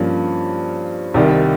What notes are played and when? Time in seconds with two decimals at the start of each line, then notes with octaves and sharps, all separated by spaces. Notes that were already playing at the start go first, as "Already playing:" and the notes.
Already playing: G2 F3 A#3 C#4
1.14 C2 C3 D#3 G3